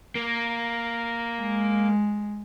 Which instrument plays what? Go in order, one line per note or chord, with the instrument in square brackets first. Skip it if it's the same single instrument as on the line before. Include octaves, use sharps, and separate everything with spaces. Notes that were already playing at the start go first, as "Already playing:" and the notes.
[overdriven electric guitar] A#3
[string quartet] G#3